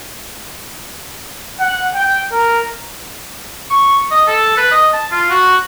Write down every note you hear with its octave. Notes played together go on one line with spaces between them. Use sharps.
F#5
G5
A#4
C#6
D#5
A4
B4
D#5
A5
F4
F#4